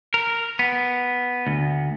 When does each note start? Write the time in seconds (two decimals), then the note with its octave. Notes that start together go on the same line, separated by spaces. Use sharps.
0.14 A#4
0.59 B3
1.47 D2